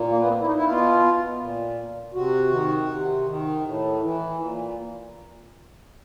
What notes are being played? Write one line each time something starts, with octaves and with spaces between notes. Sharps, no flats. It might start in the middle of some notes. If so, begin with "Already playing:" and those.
Already playing: A#2
A#3
B3
C4
E4
D#4
E4
B2 F4
A#2
C3 F#4
D#3
C3
D#3
A2
E3
A#2